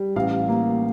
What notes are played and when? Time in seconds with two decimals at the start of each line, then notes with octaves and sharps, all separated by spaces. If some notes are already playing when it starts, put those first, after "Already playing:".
Already playing: G3
0.16 A1 F5
0.49 A#3